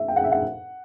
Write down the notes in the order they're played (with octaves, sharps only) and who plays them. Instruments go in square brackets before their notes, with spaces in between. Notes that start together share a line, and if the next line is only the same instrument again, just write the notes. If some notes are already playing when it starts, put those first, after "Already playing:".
Already playing: [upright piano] E5
G5
F#5
E5
F#5